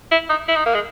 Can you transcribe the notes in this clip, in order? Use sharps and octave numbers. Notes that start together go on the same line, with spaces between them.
E4
D#4
E4
D#4
A#3
G#3